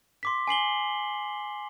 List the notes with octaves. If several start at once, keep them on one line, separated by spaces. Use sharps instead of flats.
C6 D6 B6
G#5 C7 F#7 G7